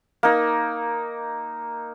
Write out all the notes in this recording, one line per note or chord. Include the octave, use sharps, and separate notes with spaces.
A#3 D#4